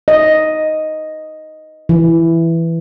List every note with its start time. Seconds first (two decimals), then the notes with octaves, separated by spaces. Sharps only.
0.08 D#5
1.89 E3